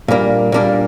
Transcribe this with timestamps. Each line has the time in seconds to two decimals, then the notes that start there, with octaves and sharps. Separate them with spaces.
0.08 A#2 G3 A#3 D4
0.52 A#2 G3 A#3 D4